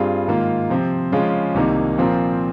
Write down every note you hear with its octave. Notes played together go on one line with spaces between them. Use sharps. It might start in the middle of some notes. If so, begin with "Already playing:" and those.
Already playing: G2 G3 C4 F4 G#4
G#2 D#3 A#3 F4
C3 F3 C4
C#3 F3 G#3 C#4 F4
C2 C3 D#3 A#3 D#4
A#2 F3 C4 F4 A#4